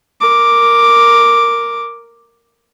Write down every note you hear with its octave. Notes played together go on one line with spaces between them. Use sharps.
A#4 D6